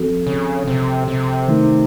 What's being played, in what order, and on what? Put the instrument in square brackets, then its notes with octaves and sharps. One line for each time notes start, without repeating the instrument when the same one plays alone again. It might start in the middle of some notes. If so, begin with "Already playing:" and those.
Already playing: [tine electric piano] F3 C4 F#4 A4
[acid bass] C#3
C3
C3
[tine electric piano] D#3 A3 D#4